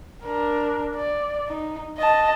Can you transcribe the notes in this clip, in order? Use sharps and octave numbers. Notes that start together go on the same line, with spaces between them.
D4 A#4
D5
D#4
D#5 A5